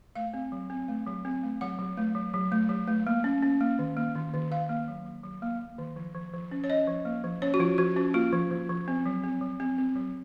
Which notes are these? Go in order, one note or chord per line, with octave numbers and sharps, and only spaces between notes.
A3 F5
C4
F#3
C4
A3
F#3
C4
A3
F#3 F#5
F#3
A3
F#3
F#3
A3
F#3
A3
A#3
C#4
C#4
A#3
D#3
A#3
D#3
D#3
D#3 F5
A#3
F#3
F#3
F#3
A#3
A#3
D#3
F3
F3
F3
C#4
C#5
C#4 D#5
F3
A#3
F3
C#4 C#5
F#4
F3 F4
F3 F#4
C#4 F#4
A#3 F4
F3
F3
F3
C4
F#3
C4
F#3
C4
C4
F#3